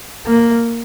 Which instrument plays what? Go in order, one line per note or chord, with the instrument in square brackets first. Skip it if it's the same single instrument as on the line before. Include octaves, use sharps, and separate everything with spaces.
[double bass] A#3